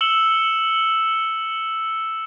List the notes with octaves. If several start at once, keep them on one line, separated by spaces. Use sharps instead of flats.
E6 C#7 E7 F#7 G7